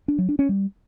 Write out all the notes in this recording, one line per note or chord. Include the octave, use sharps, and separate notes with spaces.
D4
F#3
D4
C#4
G3